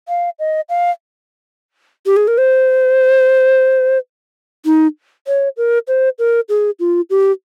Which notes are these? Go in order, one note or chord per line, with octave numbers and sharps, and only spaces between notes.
F5
D#5
F5
G4
G#4
A#4
C5
D#4
C#5
A#4
C5
A#4
G#4
F4
G4